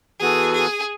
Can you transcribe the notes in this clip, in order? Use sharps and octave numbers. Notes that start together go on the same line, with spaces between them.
E3 B3 F#4 G#4 A4
G#4